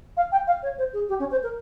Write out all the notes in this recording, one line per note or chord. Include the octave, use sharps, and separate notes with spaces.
F5
G5
F5
C#5
C5
G#4
G4
C#4
C5
A#4